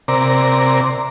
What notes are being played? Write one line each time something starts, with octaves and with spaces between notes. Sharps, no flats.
C3 A#4 D5